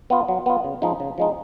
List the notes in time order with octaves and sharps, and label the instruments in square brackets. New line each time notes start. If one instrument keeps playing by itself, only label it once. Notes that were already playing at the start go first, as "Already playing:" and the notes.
[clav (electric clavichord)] B3 F4
F#3
B3 F4
C#3
F3 G#3 D#4
C#3
F3 G#3 D#4